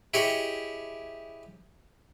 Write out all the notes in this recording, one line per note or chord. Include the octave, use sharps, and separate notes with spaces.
E4 G4 G#4 C#5 D#5